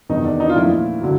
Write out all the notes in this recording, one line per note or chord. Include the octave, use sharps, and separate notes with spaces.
E2 C3 D#3 D#4
D4
D#4
F4
A#2 F3 A3 E4
D3 F#3